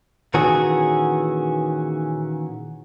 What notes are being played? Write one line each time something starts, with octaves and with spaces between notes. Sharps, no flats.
A#2 D#3 E3 C#4 F#4 G#4